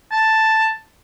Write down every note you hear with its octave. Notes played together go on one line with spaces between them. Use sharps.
A5